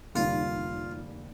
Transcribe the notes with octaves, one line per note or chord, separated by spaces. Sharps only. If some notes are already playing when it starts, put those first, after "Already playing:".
F1 D#2 D3 G3 A#3 F4